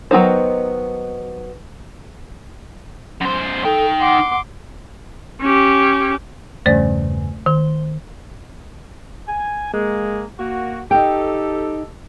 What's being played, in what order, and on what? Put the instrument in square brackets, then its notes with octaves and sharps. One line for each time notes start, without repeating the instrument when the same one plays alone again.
[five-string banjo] D#3 F#3 B3 D#4 C5
[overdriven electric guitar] F#2 C5
[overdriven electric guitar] D#4 G5 [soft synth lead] A4
[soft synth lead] F#5 [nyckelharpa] C6 D6
[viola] C#4 G4
[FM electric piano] E2 G2 C#3 [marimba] A3 C5 D5
[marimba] D#3 [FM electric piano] C5
[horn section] G#5
G#3 A#3
A#3 F#4
[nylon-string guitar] D#4 G5 [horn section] G4 A4